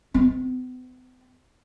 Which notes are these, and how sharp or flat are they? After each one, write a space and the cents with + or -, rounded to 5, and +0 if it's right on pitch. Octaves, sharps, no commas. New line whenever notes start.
B3 +45